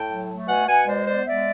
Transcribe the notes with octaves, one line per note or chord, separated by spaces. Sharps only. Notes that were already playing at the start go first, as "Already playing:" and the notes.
Already playing: A2 G5 A5
F#3
A3
B2 F#5 G#5
B2 F#5 G#5
G#3 C5 D5
B3 C5 D5
G#3 D5 E5